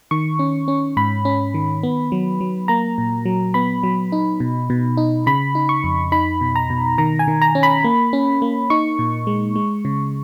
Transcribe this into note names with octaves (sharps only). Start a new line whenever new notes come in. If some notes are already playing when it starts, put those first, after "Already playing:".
D#3 C#6
C#4
C#4
G#2 B5
C#4
D#3
B3
F#3
F#3
A#3 A#5
A#2
F#3
B3 B5
F#3
D#4
B2
B2
D#4
C#3 B5
D#4
C#6
F2
D#4 B5
B2
A#5
B2
D#3 A#5
G#5
D#3
A#5
C#4
B5
A#3
C#4
A#3
D#4 C#6
A#2
G#3
G#3
C#3